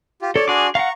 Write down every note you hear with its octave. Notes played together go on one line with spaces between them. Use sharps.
F4 G4
A4 C#5 D5
D4 F#4 G#4 C6 D6
F5 F#5 A#5 C#6